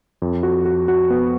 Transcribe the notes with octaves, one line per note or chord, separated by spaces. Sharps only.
F2
F#4
F#4
F#4
B3